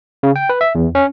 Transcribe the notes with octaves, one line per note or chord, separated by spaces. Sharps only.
C#3
G5
B4
E5
E2
C#4